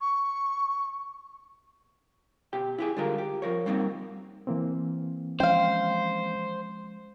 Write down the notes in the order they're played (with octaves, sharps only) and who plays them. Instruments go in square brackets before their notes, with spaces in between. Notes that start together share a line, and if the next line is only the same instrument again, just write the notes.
[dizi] C#6
[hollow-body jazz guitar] B2 G4 G5
E4 G4 G#4
D3 G3 G#3 F4 A#4
G4
F3 A#4 C#5
G3 A#3 C4 D#4 F4 F#4
[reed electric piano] E3 A#3 C4
[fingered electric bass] F3 G#3 C#4 [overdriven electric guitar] C5 [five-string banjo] F5 G5